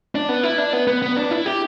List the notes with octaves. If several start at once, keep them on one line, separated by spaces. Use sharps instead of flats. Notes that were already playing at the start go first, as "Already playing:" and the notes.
D4
B3
E4
D4
B3
B3
B3
D4
E4
G4